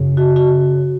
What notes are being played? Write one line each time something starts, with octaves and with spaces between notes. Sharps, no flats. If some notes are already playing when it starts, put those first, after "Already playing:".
Already playing: F#2 C#3
F#4
F#4